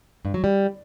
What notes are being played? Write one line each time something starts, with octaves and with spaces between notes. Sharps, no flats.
G2
F#3
G3